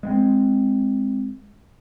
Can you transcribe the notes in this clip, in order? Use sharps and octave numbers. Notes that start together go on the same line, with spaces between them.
G#3 B3 C4